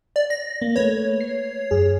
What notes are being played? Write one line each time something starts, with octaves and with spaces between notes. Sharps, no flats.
D5
A#6
A#3
A3 A#3 B4 C#5
C7
F#2 G#4